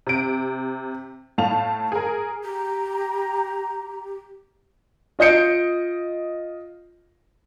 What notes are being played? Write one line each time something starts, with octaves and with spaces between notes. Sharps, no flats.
C3 D7
A2 F5 A5 F7
G#4 A#4
G4 A#5
F4 D#5 G6 C#7 D7